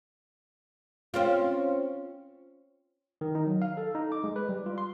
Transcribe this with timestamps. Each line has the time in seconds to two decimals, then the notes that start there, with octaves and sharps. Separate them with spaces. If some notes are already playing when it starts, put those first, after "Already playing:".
1.14 C4 C#4 F4
3.21 D#3
3.35 D#4
3.46 F#3
3.62 F5
3.77 A4
3.95 D#4
4.12 D6
4.24 G#3
4.36 B4
4.49 G3
4.66 F4
4.78 C6